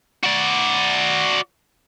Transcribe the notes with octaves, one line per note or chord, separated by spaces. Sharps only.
F#4 D5